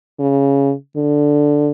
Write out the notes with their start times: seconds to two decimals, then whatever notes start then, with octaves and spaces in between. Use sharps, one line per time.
0.20 C#3
0.96 D3